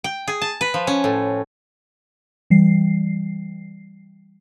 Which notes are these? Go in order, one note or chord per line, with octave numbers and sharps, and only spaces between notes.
G5
G#4
A5
B4
F3
C#4
A2
E3 G3 C7